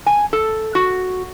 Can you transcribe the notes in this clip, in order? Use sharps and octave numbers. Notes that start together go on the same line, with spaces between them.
G#5
A4
F#4